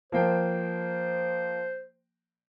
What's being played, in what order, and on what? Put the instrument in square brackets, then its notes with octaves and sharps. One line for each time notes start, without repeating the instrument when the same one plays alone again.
[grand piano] F3 A#3 G5 [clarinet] C5